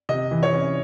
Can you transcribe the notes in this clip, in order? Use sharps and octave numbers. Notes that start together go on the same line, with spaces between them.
C3 D#5
E3
C#5
C#4